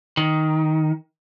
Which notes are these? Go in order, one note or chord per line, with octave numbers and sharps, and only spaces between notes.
D#3